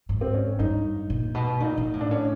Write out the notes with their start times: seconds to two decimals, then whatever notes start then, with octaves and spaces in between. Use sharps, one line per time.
0.09 G#2
0.21 C4
0.34 C#4
0.59 G2 D#4
1.10 A#2
1.35 B2
1.60 A#2 D#4
1.78 A#2
1.93 A2
2.01 D4
2.11 C#4